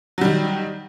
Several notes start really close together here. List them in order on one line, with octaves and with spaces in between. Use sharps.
F#3 G3 D#3